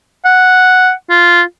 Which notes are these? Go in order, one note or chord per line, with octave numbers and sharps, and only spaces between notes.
F#5
F4